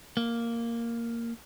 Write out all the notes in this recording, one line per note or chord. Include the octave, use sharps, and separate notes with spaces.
A#3